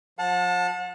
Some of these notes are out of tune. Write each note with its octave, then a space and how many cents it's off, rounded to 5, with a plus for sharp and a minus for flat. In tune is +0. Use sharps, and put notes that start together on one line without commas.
F3 +35 F#5 -40 A5 +0